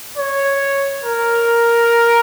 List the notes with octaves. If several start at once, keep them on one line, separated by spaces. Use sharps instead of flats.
C#5
A#4